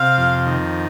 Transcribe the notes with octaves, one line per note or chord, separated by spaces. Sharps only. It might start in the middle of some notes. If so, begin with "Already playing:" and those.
Already playing: C3 F5
F2
D#3